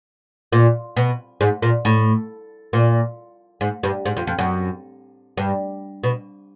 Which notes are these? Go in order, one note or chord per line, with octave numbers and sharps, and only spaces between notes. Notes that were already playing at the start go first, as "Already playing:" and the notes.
A#2
B2
G#2
A#2
A2
A#2
G#2
G2
G#2
F2
F2
F#2
G2
B2